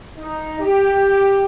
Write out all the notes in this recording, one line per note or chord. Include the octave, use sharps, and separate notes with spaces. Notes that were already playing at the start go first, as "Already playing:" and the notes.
D#4
G4